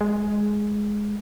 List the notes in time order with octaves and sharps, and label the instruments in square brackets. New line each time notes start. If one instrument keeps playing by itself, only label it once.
[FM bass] G#3